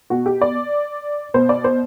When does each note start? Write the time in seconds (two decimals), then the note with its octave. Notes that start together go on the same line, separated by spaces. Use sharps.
0.10 B2 F#4
0.26 G4
0.41 D5
1.34 B2 C5
1.49 D5
1.64 C5